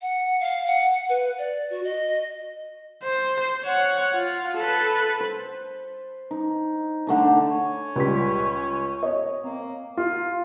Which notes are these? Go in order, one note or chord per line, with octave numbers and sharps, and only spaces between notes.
F#5
F5
F#5
B4
D5
F#4
D#5
C5
C#5 F#5
F4
A4 B4
C5
D#4
D3 A3 D#4
C#4
C#2 G3 B6
C#5 D#5
A#3 C4
F4